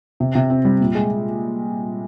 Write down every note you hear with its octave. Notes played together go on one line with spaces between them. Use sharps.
C3
C3
C4
G3
A#2
G#3